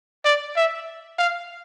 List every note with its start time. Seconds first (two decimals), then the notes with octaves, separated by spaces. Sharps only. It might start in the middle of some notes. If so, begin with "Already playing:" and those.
0.25 D5
0.56 E5
1.19 F5